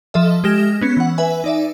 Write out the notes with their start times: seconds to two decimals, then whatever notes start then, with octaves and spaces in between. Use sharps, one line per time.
0.14 F3 A4 D#5 E5
0.44 G#3 G4 F6 A#6 E7
0.81 B3 C#4
0.97 E3 F#5
1.18 B4 E5 G#5
1.44 D#4 D5 E5